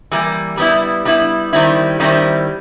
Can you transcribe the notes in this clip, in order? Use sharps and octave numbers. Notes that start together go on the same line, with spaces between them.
E3 G3 A#3
G3 B3 E4
G3 B3 E4
D#3 G3 C4 E4
D#3 G3 C4 E4